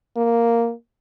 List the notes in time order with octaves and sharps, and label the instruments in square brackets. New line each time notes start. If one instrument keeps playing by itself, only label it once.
[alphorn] A#3